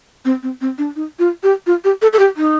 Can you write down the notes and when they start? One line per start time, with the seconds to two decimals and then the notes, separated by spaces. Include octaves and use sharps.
0.25 C4
0.43 C4
0.61 C4
0.78 D4
0.96 D#4
1.19 F4
1.43 G4
1.67 F4
1.84 G4
2.02 A4
2.13 A4
2.19 G4
2.37 D#4